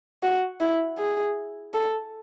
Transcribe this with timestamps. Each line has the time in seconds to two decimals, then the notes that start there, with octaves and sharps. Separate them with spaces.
0.23 F#4
0.61 E4
0.98 G#4
1.74 A4